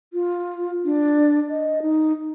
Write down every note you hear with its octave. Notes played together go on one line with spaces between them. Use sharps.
F4
D4
D#5
D#4